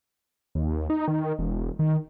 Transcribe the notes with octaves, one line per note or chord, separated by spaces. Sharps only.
D#2
D#4
D#3
E1
D#3